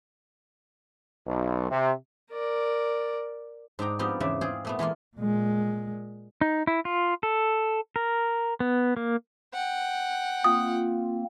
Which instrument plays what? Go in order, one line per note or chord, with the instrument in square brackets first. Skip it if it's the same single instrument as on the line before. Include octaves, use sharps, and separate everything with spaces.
[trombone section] B1
C3
[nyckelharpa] A#4 D5
[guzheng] G#2 D4 D#4 G5 A#5
F3 B3 C4 D#4 F4 G4
E2 G#2 C#3 D5 E5
C4 F4 G#4 C5
A#2 A3 B3
E3 G#3 A#3 F4
[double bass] A#2 G#3
[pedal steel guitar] D#4
E4
F4
A4
A#4
B3
A#3
[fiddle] F#5 G5
[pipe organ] A#3 C4 [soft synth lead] F4 [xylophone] D#6